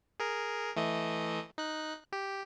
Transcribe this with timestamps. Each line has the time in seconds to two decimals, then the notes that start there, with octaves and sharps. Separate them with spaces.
0.20 G#4 A#4
0.76 E3 A3 D#5
1.58 D#4 F#6
2.12 G4